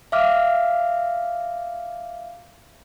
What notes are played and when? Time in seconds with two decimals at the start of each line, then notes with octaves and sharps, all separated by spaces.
0.12 E5 F5 D6 F6